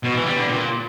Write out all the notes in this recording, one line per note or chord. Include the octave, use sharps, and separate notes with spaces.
B2
E3
G3
D3
A#2